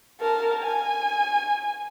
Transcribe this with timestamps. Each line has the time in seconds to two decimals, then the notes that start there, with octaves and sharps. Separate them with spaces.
0.21 A#4 A5
0.62 G#5